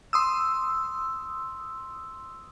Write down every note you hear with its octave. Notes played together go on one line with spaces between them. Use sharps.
C6 D#6 E6